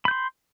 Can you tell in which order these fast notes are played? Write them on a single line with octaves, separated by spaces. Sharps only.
B5 G6 C6